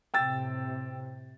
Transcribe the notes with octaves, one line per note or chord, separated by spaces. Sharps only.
A2 C3 G5 E6 A6